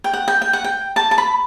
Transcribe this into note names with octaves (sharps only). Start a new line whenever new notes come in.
G5
F#5
G5
G5
F#5
G5
A5
A5
B5